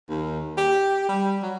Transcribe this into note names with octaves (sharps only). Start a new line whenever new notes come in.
D#2
G4
G3
F#3